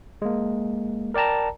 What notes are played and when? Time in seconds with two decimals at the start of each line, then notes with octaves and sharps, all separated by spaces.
0.22 G#3 A#3
1.14 A#4 D5 G5 A5 A#5